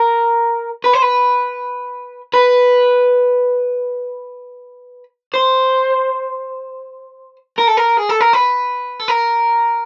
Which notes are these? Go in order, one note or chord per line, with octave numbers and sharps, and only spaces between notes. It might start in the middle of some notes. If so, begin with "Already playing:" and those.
Already playing: A#4
B4
C5
B4
B4
C5
A#4
A4
A#4
G#4
A4
A#4
B4
A4
A#4